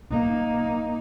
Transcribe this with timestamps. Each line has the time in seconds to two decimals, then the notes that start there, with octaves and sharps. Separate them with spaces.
0.11 A#3 D#4